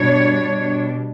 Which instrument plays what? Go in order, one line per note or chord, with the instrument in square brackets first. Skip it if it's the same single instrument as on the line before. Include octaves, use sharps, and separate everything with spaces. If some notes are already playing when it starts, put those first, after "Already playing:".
Already playing: [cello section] B2 G3 D4 C#5